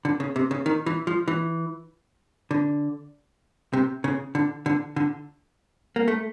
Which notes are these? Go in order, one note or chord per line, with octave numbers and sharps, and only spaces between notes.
D3
C#3
C3
C#3
D#3
E3
F3
E3
D3
C3
C#3
D3
D3
D3
A#3
A3